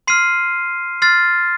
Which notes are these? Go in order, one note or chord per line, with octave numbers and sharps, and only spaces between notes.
C6 F6 C7 D#7
C6 F6 A6 C7